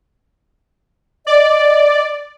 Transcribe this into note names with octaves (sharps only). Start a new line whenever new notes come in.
D5 D#5